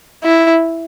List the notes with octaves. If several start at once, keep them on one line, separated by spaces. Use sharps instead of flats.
E4